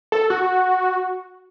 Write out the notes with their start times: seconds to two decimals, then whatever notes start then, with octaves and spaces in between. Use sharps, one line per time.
0.12 A4
0.30 F#4